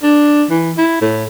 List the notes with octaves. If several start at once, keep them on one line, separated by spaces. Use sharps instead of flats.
D4
E3
E4
A2